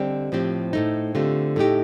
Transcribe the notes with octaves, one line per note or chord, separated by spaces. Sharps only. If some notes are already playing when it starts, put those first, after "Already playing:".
Already playing: D3 G3 C4 G4 D5 D#5
A2 F3 C4 G4 C5
A2 A3 D#4
D3 A3 C4 F4 G4
A2 A3 D#4 G4 A4